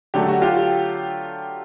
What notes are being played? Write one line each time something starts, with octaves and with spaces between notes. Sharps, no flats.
D3 F#3 A3 G4
F#4
F4 G4